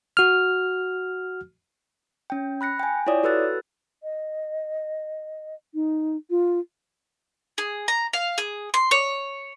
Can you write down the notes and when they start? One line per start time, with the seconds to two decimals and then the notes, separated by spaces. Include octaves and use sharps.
0.17 F#4 F6
2.30 C#4 G5
2.61 B5 F#6 A#6 C#7
2.80 G5 G#5
3.07 E4 F4 C#5 D5 D#6
3.23 F#4 A4 B4 E6 F#6 A6
4.03 D#5
5.74 D#4
6.30 F4
7.58 G#4
7.88 A#5
8.13 F5
8.38 G#4
8.74 C6
8.91 C#5